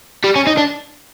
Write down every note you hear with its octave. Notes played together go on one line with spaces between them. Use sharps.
G3
C#4
D#4
D4